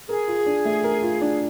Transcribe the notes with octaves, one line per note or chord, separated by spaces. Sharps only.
G#4 A#4
F4
D4
A3
A#4
F4
D4